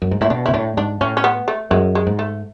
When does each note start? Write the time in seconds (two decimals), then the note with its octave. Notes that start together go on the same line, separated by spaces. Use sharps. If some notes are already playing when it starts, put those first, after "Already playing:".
0.02 F#2
0.11 G#2
0.21 A2 E4
0.30 B2 D4
0.46 E4
0.48 B2
0.54 A2 D4
0.77 G#2 D4
1.01 A2 C#4
1.17 C#4
1.24 B3
1.48 A3
1.71 F#2 G#3
1.95 G#3
2.07 G#2
2.19 A3